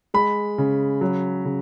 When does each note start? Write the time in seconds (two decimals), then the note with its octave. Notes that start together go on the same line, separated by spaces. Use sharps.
0.14 G#3 B5
0.58 C#3
1.01 F#3
1.45 C#3